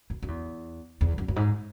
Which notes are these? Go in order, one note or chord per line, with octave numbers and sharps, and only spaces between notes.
F#2
F#2
E2
E2
F#2
F#2
G#2